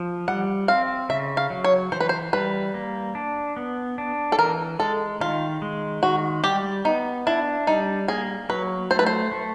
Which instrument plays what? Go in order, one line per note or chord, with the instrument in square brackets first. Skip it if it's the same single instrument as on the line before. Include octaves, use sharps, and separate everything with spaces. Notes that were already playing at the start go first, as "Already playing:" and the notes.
Already playing: [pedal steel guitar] F3
[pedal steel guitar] G3 [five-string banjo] F#5
[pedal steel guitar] C4 [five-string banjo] F5
[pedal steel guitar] C#3 [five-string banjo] E5
[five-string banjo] F5
[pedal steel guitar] F#3
[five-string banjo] C#5
[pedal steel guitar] E3 [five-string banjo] C5
[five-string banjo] B4
C5
[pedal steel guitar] G3 [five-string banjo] B4
[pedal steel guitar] A#3
D4
B3
D4
[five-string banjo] A4
[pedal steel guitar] E3 [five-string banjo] A#4
[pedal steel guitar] G#3 [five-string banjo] A4
[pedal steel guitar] D#3 [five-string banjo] F4
[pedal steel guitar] G#3
[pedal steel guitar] D#3 [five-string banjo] F#4
[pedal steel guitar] G3 [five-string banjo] G4
[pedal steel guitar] B3 [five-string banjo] D#4
[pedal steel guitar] D4 [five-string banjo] E4
[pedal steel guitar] G3 [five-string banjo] D#4
[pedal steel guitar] A#3 [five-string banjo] G#4
[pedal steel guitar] F#3 [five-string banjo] B4
[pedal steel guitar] A3 [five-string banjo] C5
[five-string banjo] B4
C5
[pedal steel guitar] A3